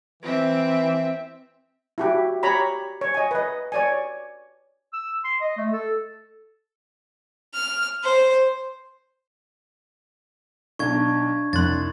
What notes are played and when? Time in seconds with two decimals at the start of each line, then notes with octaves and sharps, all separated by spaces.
0.23 E3 C4 E5
1.98 E4 F#4 G4
2.43 G4 C#5 A#5 B5
3.01 C#5
3.14 D#5 G#5
3.31 B4 D#5
3.72 C#5 D5 G#5
4.93 E6
5.24 C6
5.41 D#5
5.57 A3
5.72 A4
7.54 F6
8.03 C5
10.79 B1 D4 D#4 C#6 G#6
11.53 C2 F2 C6 F#6 A6